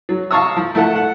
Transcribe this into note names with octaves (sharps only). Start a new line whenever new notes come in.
F#3
F5 A5 A#5 C#6 D#6 E6
F3
A3 E4 F4 A4 F#5 A5
F#5